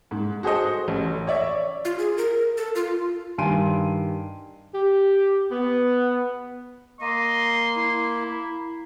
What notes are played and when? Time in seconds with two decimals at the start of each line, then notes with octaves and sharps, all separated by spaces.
0.11 G#2
0.43 F#4 G#4 A4 C5 D#5
0.88 A1
1.27 C#5 D5 E5
1.85 F4
1.99 G#4
2.18 A#4
2.57 A4
2.75 F4
3.38 G2 D#3 G#5 C6 D7 D#7
4.73 G4
5.51 B3
7.01 A#3 D#5 C6
7.77 E4